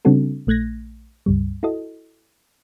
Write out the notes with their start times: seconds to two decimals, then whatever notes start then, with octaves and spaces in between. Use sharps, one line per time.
0.05 C#3 G3 C4 D4 F#4 A4
0.47 A#1 A3 F#6 G#6 A#6
1.26 C#2 G2 G3
1.63 E4 F#4 A4 D#5